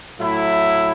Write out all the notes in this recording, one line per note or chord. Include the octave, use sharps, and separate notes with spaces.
A2 F#3 A3 E4